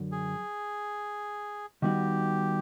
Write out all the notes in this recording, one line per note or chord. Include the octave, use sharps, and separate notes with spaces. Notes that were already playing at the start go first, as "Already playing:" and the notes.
Already playing: F#2 D3 F#3
G#4
D#3 G3 B3 D#4 F#4 G4